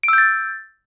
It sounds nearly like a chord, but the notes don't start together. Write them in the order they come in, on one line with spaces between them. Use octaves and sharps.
D7 E6 G6 A6